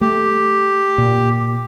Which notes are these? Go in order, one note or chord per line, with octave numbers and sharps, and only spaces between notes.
A3 G4
A#2